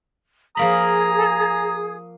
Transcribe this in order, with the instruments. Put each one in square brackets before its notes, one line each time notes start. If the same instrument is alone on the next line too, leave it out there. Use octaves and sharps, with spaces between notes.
[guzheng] F3 A#3 B5 [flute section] G#4 [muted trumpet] A#5 [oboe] D#6